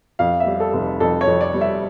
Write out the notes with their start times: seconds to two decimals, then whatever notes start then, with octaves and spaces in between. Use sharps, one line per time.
0.19 F2 F5
0.40 E5
0.46 G3
0.60 A4
0.74 F1
1.00 F2 A4
1.21 C#5
1.27 F2
1.41 D5
1.54 G3
1.61 E5